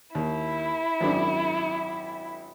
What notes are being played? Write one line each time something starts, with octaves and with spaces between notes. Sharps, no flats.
D#2 E4
G#1 F#2 D4